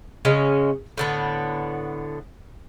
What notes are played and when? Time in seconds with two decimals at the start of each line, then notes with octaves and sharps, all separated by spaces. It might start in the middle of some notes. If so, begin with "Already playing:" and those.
0.25 C#3 G#3 C#4
0.97 A2 D3 B3